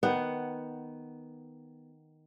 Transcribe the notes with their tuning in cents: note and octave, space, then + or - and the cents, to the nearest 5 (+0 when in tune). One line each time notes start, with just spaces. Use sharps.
D#3 +0 B3 +0 F#5 +10